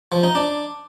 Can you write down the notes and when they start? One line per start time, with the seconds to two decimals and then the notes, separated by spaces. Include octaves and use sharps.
0.12 F3
0.23 D#4
0.35 D4